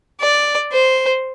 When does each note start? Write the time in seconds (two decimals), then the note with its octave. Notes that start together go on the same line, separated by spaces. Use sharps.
0.21 D5
0.73 C5